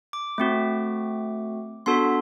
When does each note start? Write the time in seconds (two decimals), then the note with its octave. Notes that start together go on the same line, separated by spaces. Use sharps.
0.13 D6
0.38 A3 C4 F#4
1.86 B3 D4 F#4 A4 C6